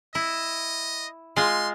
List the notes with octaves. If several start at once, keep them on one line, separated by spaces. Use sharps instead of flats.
E4 D#5
G#3 F4 C6